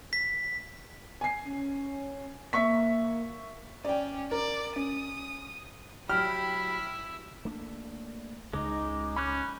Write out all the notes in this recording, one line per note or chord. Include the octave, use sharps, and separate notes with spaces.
B6
G#5 C7
C#4
A#3 E5 C#6 B6
C#4 D5 G5
A#4 D5
C#4 D#6
F#3 E4 G4 B5 F6
A3 A#3 D4
C#2 C#3 G#3 D#4 D6
C#4 B5 F#6 G6